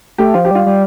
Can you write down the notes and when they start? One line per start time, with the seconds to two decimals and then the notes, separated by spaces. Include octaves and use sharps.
0.18 A3 G4
0.34 F3 F4
0.45 G4
0.51 G3 F4
0.66 G3